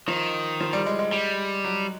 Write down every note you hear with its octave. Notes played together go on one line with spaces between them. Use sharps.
D#3 F3
F3
G3
G#3
G#3
G3
F#3